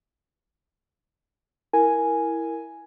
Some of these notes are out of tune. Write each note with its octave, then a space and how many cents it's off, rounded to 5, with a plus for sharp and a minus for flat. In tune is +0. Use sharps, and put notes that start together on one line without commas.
E4 +0 A#4 +0 G#5 +0